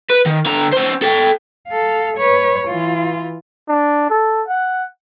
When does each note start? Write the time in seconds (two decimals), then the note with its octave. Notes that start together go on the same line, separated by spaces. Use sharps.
0.10 B4
0.26 D#3
0.45 D3 A#5
0.72 C#4 C5
1.02 A4 G5
1.68 A4 F5
2.17 B4 C#5
2.67 E3 F4
3.69 D4
4.10 A4
4.48 F#5